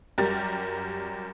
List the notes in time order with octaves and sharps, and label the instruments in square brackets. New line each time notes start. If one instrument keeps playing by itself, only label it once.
[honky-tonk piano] F#2 G3 G4 A#4 A6